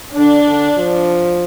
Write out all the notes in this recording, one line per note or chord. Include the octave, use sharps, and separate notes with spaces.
D3 D4
D3
F3